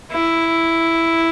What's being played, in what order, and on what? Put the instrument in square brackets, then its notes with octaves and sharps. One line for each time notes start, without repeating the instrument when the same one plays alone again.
[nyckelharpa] E4